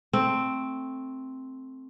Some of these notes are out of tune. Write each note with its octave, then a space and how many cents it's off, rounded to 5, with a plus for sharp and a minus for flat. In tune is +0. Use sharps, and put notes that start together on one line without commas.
A3 +0 C4 +0